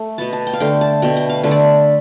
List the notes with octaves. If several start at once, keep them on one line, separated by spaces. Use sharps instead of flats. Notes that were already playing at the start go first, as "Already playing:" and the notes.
Already playing: A3
B2 B3 A5
A5
G5
F5
D3 A3 G5
A5
B2 A3 G5
G5
F5
D3 A3 E5
D5
E5